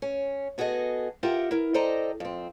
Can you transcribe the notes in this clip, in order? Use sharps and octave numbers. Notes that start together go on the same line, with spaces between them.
C#4
B3 F#4 G#4 A4 D#5
F4 G4 A#4 E5 F#5 G5
E4 A#4
A4 C5 D5 D#5 G5 A#5
F2 C4